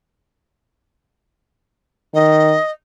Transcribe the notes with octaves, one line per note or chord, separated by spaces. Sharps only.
D#3 D#5